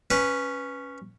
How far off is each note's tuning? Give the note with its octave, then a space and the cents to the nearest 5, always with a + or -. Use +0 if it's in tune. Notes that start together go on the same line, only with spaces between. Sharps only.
C#4 +0 B4 +0